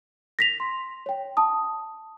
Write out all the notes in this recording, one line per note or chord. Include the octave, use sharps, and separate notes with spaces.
A#6 B6 F7
C6
C#5 G5
A5 D#6